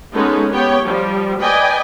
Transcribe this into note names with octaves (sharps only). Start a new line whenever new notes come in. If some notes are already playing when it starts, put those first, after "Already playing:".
G#3 B3 C#4 D#4 A4
B3 G4 C#5 G5
F3 G3
B4 D5 D#5 G5 G#5